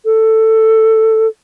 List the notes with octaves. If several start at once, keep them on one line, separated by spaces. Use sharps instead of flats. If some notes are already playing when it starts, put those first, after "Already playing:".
A4